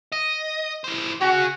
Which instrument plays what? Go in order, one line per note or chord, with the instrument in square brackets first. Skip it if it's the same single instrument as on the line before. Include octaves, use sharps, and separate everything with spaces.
[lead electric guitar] D#5
E3 C5
[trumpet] F#4 [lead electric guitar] G#4 C#5